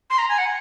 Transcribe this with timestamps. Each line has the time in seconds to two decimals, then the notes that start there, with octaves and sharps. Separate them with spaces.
0.10 C6
0.18 A#5
0.29 G#5
0.38 F#5